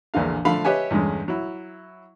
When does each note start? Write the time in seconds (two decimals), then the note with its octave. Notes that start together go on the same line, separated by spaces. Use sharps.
0.14 A#1 E2 A#2 D3 F5
0.45 D3 F3 A3 F5 B5
0.64 G4 B4 C#5 D#5 E5 G#5
0.91 E2 G2 D3 G#3 C#4
1.28 F#3 E4